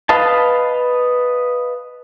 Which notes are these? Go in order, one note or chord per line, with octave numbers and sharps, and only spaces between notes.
B4 D#5 F5 A5